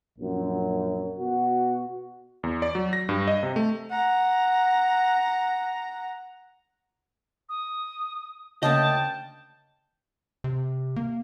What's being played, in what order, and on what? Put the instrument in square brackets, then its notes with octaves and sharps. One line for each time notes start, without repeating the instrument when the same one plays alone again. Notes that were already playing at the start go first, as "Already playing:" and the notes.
[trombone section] A#1 F#2
B2 F#4
[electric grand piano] E2
D5
F#3
A#6
G2
D#5
C3
A3
[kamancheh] F#5 A#5
[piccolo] D#6
[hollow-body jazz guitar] D2 A#3 D#5 [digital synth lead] C#3 [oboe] G5 [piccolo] A5
[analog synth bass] C3
A#3